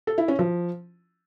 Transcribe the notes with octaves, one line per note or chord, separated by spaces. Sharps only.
A4
E4
C#4
F3